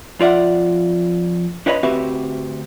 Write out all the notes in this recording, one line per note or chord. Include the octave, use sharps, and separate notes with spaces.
F2 F4 D5 E5 F#5
D4 E4 B4 C#5 D#5 B5
D2 C4 F#4 G4 B4 E5